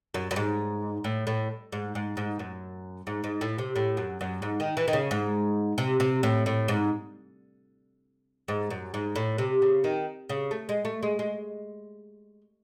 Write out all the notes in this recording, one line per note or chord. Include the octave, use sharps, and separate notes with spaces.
F#2
F#2
G#2
A2
A2
G#2
G#2
G#2
F#2
G#2
G#2
A2
C3
A2
F#2
F#2
G#2
D#3
E3
D#3
C#3
G#2
C3
C3
A2
A2
G#2
G#2
F#2
G#2
A2
C3
C#3
D#3
C#3
A3
G#3
A3
G#3
G#3